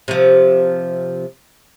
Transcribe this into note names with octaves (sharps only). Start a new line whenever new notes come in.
C3 F3